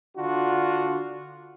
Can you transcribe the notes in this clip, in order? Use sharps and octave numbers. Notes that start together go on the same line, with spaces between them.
D3 D4 F4 F#4